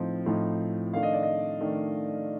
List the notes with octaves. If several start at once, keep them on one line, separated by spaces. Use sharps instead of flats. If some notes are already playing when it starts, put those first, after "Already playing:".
Already playing: A2 F3 C4 D#4
A2 F3 C4 D#4
D#3 A3 D4 F5
D#5
D5
D#5
D#3 A3 D4